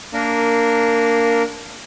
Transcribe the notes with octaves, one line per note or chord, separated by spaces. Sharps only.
A#3 D4 A#4